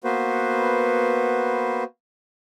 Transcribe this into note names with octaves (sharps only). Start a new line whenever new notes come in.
A#3 B3 F#4 B4 C5